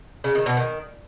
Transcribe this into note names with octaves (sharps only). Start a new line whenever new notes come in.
C#3
D#3
B2
D#3